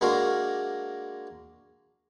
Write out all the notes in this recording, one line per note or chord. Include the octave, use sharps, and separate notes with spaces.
G#3 A#3 D4 F#4 A#4